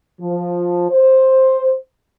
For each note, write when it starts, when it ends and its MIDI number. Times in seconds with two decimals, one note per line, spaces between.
0.21 0.89 53
0.91 1.75 72